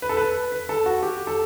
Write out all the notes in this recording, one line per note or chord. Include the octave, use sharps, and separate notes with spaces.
B4
A4
B4
B4
A4
F#4
G4
A4